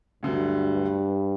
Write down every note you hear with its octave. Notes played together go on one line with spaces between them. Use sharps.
D2 G2 D3 F#3